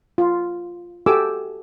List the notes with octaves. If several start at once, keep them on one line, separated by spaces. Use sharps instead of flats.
F4
F#4 G4 A4 G#5 D6 E6